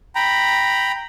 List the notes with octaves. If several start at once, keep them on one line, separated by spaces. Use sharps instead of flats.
G5 A#5 B5